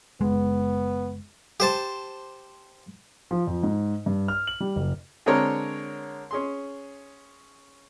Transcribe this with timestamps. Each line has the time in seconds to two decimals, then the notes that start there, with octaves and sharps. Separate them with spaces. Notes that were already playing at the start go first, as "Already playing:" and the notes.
0.21 F#1 G#3 B3
1.60 G4 C5 A5
3.31 F3
3.47 F2
3.63 G#2
4.06 G2
4.28 F6
4.47 F#7
4.61 G3
4.76 F#1
5.26 D3 G#3 C4 G#4 A#4 C#5
6.31 C#4 G#4 C6